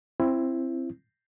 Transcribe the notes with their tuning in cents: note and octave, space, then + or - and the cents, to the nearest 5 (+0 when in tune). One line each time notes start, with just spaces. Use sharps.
C4 +10 E4 +20